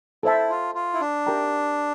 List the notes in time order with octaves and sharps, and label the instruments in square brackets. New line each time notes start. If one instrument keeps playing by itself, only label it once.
[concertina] E4 [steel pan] A4 C5 E5 A5
[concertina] F4
F4
E4
D4
[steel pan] G4 A#4 E5 G5 A#5